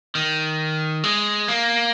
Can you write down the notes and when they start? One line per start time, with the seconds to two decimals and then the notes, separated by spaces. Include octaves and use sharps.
0.15 D#3
1.04 G#3
1.48 A#3